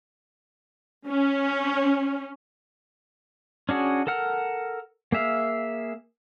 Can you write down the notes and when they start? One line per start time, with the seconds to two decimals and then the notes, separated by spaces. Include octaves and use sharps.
1.07 C#4
3.69 C#4 D4 F#4 G#4
4.07 A4 A#4 F#5 F6
5.12 A#3 G#4 E5 F5